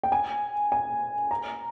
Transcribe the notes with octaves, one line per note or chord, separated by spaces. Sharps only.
G5
G#5
G#5
A#5